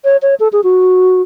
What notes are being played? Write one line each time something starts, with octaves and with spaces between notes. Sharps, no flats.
C#5
C#5
A4
G#4
F#4